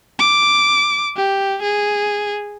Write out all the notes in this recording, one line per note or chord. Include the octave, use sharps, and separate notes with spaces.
D6
G4
G#4